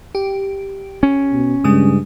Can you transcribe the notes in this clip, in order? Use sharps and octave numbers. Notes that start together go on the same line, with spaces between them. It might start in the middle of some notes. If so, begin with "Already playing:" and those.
G4
C#4
B2
G2 C#3 G#3 D#6